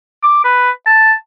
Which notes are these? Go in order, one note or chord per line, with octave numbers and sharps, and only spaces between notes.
D6
B4
A5